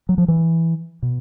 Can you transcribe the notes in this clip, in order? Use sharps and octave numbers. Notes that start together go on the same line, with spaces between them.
F#3
F3
E3
B2